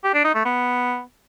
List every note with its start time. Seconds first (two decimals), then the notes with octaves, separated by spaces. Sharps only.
0.04 G4
0.14 D4
0.24 D#4
0.35 A3
0.45 B3